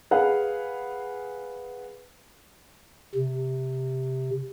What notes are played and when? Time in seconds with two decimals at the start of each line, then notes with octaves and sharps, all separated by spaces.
0.11 G#4 B4 F5 F#5
3.15 C3